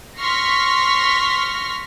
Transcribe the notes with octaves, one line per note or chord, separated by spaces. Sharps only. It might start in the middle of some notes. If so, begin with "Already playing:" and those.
C6 C#6 F6 A#6 B6